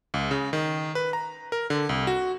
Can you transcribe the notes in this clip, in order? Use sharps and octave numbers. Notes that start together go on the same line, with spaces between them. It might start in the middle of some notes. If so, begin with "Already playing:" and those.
C#2
C#3
D#3
B4
A#5
A#4
D3
C2
F#4